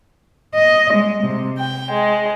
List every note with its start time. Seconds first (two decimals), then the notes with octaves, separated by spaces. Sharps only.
0.55 D#5
0.94 G#3
1.24 C3
1.58 G5
1.91 G#3